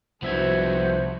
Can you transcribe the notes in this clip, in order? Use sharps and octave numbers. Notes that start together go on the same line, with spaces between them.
C2 F3 B3 D4 F#4 C5 E5 G#6